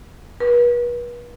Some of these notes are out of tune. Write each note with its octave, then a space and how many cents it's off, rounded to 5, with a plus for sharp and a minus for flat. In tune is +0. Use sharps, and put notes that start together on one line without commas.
B4 -40